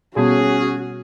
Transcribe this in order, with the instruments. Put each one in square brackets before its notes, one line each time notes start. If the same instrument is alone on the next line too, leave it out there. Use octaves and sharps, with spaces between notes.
[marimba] B2 G3 B3 [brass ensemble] C#4 G#4 [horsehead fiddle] F#4